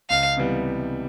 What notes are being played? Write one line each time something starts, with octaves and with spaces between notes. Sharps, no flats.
C#2 F5
C3 E3 G3 B3